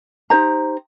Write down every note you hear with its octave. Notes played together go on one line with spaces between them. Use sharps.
D#4 G4 C5 A#5